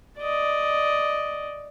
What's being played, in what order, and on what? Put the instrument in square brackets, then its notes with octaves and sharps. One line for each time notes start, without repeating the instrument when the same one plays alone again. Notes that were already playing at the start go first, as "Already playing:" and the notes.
[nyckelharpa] D5 D#5